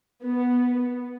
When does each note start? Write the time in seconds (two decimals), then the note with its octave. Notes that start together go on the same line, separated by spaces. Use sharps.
0.25 B3